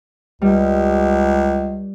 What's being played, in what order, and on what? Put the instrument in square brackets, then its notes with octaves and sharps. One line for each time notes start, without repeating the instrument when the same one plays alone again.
[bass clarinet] C#2 [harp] G3